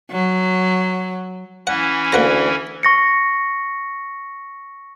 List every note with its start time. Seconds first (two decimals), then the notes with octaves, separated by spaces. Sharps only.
0.11 F#3
1.67 E3 C#4 E4 F#5
2.13 D2 A#3 F#5 A#5
2.83 C#6 A#6 C#7